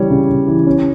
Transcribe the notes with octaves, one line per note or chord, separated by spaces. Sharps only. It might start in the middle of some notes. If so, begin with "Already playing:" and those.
Already playing: C#3 E3 G3 C#5
C#3
C#3
E3
C#4